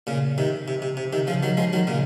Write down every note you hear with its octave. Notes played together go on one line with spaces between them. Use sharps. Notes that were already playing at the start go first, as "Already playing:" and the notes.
A#2 C#3
C3 D#3
C3
C3
C3
C3 D#3
C#3 F3
D#3 F#3
F3 G#3
D#3 F#3
A#2 C#3